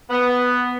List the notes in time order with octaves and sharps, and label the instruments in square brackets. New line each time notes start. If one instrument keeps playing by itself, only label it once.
[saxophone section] B3